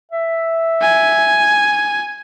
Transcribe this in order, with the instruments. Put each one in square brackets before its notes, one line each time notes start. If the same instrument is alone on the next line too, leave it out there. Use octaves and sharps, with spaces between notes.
[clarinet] E5
[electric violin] G#5